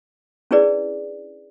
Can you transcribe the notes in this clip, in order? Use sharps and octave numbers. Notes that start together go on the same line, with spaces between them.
C#4 D4 E4 G#4 B4 D5